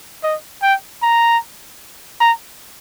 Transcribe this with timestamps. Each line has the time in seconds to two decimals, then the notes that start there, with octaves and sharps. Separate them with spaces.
0.23 D#5
0.62 G5
1.02 A#5
2.20 A#5